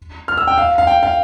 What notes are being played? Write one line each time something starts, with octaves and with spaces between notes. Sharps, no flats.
F6
E6
G5
F5
F5
G5
F5